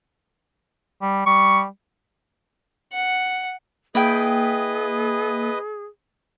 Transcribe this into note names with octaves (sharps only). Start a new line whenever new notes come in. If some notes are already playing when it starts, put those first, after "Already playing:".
G3
G3 C#6
F#5
A#3 E4 G#4 B4 D#5 G5